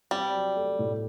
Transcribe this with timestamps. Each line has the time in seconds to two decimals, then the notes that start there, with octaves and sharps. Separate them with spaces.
0.11 G3 C4
0.34 F#3
0.56 A3
0.79 A2